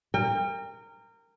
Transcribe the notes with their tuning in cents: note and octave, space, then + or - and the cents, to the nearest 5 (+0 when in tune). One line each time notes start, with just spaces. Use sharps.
A#4 -20 G5 +35